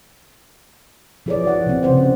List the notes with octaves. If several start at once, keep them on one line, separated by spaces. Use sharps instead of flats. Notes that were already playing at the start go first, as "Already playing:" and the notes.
F3 E4 G#4 B4 C#5 D5
F3 F#4 F#5
C3 C4
C#3 C5 F#5